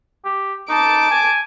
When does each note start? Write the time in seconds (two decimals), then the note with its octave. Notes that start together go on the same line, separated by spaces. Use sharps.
0.25 G4
0.69 D#4 A5 D6
1.11 G#5